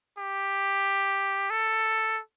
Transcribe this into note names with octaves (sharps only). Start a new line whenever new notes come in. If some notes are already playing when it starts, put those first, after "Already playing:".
G4
A4